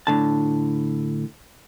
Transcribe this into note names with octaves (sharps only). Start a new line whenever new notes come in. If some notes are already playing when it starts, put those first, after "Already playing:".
A2 D3 A5